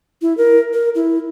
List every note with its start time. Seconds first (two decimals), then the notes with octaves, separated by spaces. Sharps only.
0.22 E4
0.38 A#4
0.73 A#4
0.95 E4